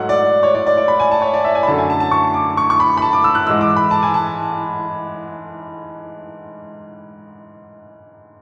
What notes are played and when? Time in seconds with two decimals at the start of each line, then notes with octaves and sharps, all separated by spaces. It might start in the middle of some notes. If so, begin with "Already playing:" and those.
Already playing: G#2 F#3 A3 F#5
0.09 D5
0.43 C#5
0.54 D5
0.66 D5
0.77 D5
0.88 B5
1.00 G#5
1.11 A5
1.22 C#5
1.33 D5
1.44 E5
1.55 G#5
1.63 B5
1.67 F#2 D3 F#3 A3 C#4 A5
1.78 G#5
1.90 A5
2.00 A5
2.11 C#6
2.34 D6
2.57 C#6
2.70 C#6
2.80 B5
2.97 B5
3.02 A5
3.13 D6
3.24 E6
3.35 F#6
3.47 G#2 E3 G#3 E6
3.61 D6
3.76 B5
3.91 A5
4.02 G#5
4.14 A5